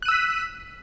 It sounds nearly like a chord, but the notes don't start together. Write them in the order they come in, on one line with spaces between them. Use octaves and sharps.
F#6 D#7 E6 B6